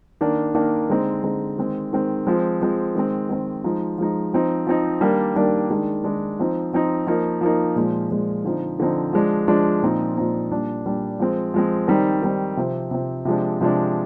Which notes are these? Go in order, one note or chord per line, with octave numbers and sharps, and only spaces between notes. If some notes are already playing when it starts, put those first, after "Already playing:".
D#3 A#3 D4
D#3 A#3 D4
D3 G#3 C4 D#4
D3 G#3 C4 D#4
D#3 G#3 C4
D#3 G#3 C4
F3 G#3 C4
F3 G#3 C4
D#3 G#3 C4
D#3 G#3 C4
F3 G#3 D#4
F3 G#3 D#4
F3 C4 D#4
F3 C4 D#4
D#3 G3 A#3 D4
D#3 G3 A#3 D4
D#3 G#3 D4
D#3 G#3 D4
F3 C4 D#4
F3 C4 D#4
F3 A#3 D#4
F3 A#3 D#4
A#2 F3 G#3
A#2 F3 G#3
D3 F3 C4 D#4
D3 F3 C4 D#4
F3 G#3 D4
F3 G#3 D4
A#2 F3 C4 D#4
A#2 F3 C4 D#4
A#2 G3 D4
A#2 G3 D4
F3 G#3 C4
F3 G#3 C4
D#3 G3 C4 D#4
D#3 G3 C4 D#4
C3 F3 C4
C3 F3 C4
C3 F3 G#3 D4
C3 F3 G#3 D4